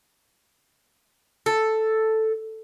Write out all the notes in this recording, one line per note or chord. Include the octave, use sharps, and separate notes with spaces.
A4